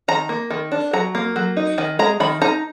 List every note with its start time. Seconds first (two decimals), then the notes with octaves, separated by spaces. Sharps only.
0.08 D#3 A#5
0.29 A#3
0.50 D#3
0.72 D4
0.93 F#3 A#5
1.15 A#3
1.36 F#3
1.57 D#4
1.78 D#3 G#5
1.99 G#3 A#5
2.20 D#3 B5
2.42 D#4 A#5